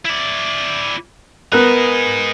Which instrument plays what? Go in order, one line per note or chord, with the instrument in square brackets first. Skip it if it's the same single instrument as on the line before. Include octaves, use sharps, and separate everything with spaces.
[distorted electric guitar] E4 D5
[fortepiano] B3 A#4 F#6 [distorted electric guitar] D#4 G#4